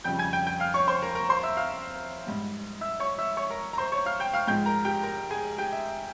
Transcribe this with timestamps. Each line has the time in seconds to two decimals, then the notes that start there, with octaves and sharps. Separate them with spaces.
0.04 F2 C#3 G3 G5 G6
0.19 G#5 G#6
0.33 G5 G6
0.47 G5 G6
0.60 F5 F6
0.74 C#5 C#6
0.87 C5 C6
1.02 A#4 A#5
1.15 A#4 A#5
1.29 C5 C6
1.43 E5 E6
1.57 F5 F6
2.26 G#2 G3
2.81 E5 E6
3.00 C#5 C#6
3.18 E5 E6
3.37 C#5 C#6
3.50 A#4 A#5
3.73 A#5
3.78 C5 C6
3.92 C#5 C#6
4.06 F5 F6
4.20 G5 G6
4.33 F5 F6
4.47 G#2 F3 G#3 G5 G6
4.66 A#4 A#5
4.85 G4 G5
5.03 A#4 A#5
5.31 G#4 G#5
5.58 G4 G5
5.72 E5